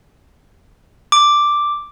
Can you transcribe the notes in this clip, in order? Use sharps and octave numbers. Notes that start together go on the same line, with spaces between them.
D6